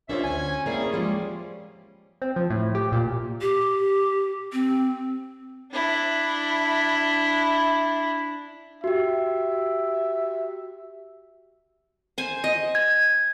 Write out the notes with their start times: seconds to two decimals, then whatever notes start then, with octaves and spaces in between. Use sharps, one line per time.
0.09 D#2 C#4 D4 F4 C5 E5
0.24 D2 G#5
0.66 A#3 C4 E4 G#4 D5
0.93 F3 G3 G#3 A#3 F4
2.22 C4
2.36 F3
2.50 A2
2.75 G4
2.92 A#2
3.41 G4
4.52 C4
5.72 D4 E4
8.84 F#4 G4 E5
12.18 C5 G#5
12.44 D#5
12.75 G#6